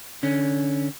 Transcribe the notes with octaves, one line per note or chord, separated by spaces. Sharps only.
D3 C#4